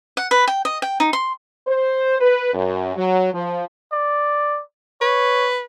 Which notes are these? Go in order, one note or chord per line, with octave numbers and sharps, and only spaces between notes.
F#5
B4
G5
D#5
G5
D#4
C6
C5
B4
F#2
F#3
F3
D5
B4 C#5